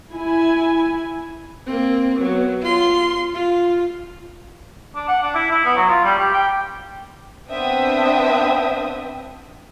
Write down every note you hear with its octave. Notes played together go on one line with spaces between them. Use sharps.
E4 G#5
A#3 C4
F#3 B3
F4 C6
F4
D4
F#5
D4
E4
E4
B3
F#3
F4
G3
G4
G5
B3 C4 D4 E5 G5 D#6